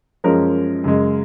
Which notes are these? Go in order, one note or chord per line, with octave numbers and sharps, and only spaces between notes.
F#2 F3 G#3 C#4 A#4
F#2 C#3 G#3